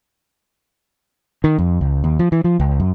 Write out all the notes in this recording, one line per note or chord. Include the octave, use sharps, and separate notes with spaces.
D#3
F2
C#2
D#2
F3
E3
F3
C#2
F#2